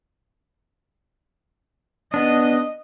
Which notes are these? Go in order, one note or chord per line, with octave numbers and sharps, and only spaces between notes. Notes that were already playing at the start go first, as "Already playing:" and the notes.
B3 D4 D#5